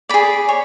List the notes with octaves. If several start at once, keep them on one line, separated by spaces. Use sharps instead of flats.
G#4 D5 B5
C#5